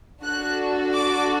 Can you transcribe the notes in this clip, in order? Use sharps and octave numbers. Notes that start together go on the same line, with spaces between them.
D4 F#4 A4 F#6
D6